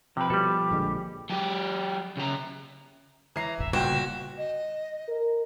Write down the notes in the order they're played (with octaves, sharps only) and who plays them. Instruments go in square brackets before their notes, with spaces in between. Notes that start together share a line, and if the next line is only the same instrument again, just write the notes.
[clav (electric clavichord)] C3 [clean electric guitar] F3 B4 [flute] G5
[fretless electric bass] B2 [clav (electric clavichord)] G3 A4 [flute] G4
[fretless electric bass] A#1 D3 G#3
[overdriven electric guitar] F#3 G4
C#3 A#5
[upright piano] E3 C7 [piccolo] A#5
[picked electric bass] E1 A1 [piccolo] E5
[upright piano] G1 A#2 G5 [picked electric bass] C#3 G3 [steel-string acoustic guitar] F#4 [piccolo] E7
[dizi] D#5
[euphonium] A#4